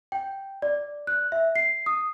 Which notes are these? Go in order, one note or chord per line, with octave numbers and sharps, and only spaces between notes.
G5
D5
F#6
E5
C7
D#6